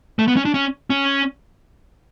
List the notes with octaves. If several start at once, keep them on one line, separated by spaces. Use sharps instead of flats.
A3
B3
C#4
D4
C#4
C#4